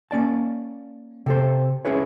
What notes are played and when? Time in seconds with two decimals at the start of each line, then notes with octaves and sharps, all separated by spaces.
0.11 A#3 C#4 D5 A5
1.26 C3 A4 C5
1.85 C#4 E4 G#4 B4 C#5